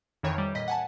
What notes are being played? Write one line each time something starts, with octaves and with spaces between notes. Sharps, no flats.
F2 D#3 E3 C#5
G3
A#2 D#5 B6
F#5 G#5 A5